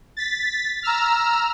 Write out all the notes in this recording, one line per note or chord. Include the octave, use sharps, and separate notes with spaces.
A6 B6
A#5 E6 F6